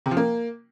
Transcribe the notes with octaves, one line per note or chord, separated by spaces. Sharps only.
C3
F3
A#3